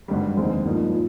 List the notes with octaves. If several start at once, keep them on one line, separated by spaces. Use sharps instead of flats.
G#1 G2 D3 G3
F1 D#2 D3 G#3 C4
G#1 G2 F3 A#3 D#4
A#2